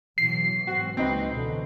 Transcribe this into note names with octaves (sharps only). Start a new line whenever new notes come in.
B2 E3 F#3 C7
G#2 C4 F#4
C#2 C4 D#4 B4
B2 D3 E3